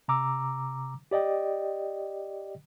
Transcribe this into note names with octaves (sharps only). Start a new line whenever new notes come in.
C3 A#5 D6 E6
G4 D5 D#5 G5